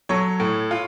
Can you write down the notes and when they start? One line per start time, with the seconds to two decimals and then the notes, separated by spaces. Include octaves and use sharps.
0.09 F#3 A4 C#5
0.40 A2
0.71 F4